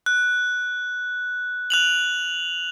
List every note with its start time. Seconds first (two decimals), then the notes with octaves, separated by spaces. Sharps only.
0.06 F#6
1.70 F#6 F7 F#7